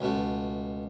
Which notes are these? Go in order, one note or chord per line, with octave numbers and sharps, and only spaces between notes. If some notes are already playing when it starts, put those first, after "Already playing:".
C#2 B2 A3